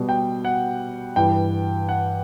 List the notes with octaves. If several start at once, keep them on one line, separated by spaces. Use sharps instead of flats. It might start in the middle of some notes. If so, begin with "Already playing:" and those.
Already playing: B2 G3
G5
F#5
G2 E3 G3 G5
F#5